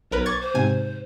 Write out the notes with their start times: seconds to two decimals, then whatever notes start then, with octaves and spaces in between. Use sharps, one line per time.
0.11 B1 A#4 B4 C#5
0.26 C#6 D6 G#6 A6
0.41 C5
0.54 G#2 C3 G#5